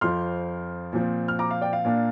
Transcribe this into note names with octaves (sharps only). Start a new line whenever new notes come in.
F2 F3 C4 C6 F6
A#2 F3 C4
F6
A#5 D6
F5
D5 G5
F5
A#2 A#3 D4